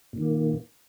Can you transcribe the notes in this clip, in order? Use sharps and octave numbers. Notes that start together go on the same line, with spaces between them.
A#2 D#3 A#3